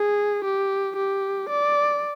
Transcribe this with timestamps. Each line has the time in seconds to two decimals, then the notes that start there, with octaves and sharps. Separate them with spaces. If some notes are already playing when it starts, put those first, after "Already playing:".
Already playing: G#4
0.45 G4
0.97 G4
1.50 D5